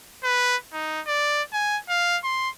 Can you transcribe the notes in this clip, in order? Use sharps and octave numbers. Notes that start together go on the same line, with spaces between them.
B4
D#4
D5
G#5
F5
C6